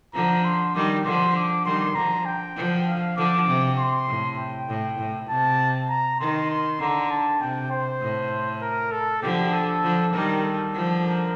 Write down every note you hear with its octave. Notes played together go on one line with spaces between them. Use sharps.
D3 F3 A#5
C6
D#3 G3 D6
D3 F3 C6
D6
D#3 G3 C6
D3 F3 A#5
G5
D3 F3
F5
D3 F3 D6
C3
C6
A2
G5
A2
A2
C3 A5
A#5
D#3 C6
C6
D3 A#5
A5
C3 G5
C5
A2
A#4
A4
D3 F3 G4
A4
D3 F3
D#3 G3 A#4
A4
D3 F3
A#4